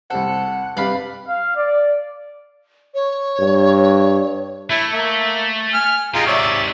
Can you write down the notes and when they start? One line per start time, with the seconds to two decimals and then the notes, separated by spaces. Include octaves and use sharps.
0.10 C2 C3 A4 C5 F#5
0.77 G2 C3 G3 B4 D5 F5 B5
1.27 F5
1.55 D5
2.94 C#5
3.39 G2
4.70 A3 E4
4.93 A#3 E5
5.74 G#5 F6
6.14 G#2 C3 G#3 F4 A#5
6.27 C#5 D5 E5